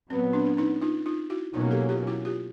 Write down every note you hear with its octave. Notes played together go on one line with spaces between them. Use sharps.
A#2 F#3 B3 C4
C4 D4
D4
C#4 D#4
D#4 F4
D#4 F4
E4 F#4
B2 F#3 A#3 C#4 D#4 F4
G4 A4
F4 G4
E4 F#4
F4 G4